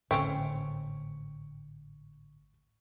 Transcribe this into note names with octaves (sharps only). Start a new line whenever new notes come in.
G#1 A2 D3 A3 C4 C#4 G5 C#6